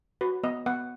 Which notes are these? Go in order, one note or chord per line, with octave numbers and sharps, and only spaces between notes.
F#4 B4
B3 D#5
B3 F#5